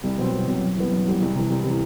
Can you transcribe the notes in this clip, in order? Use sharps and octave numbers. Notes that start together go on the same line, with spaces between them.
C2
B2 F#3 C4
C2
B2 F#3 C4
F#2
E3 G3 B3
F#2
E3 G3 B3
C2
C3 E3
C2
C3 E3